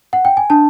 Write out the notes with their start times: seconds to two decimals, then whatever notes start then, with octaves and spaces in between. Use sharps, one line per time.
0.13 F#5
0.25 G5
0.37 G#5
0.50 D4 A5